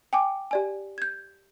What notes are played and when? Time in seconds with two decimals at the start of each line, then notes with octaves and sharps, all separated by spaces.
0.13 G5 G#5 D6
0.51 G4 D5 G#5
0.98 G6 G#6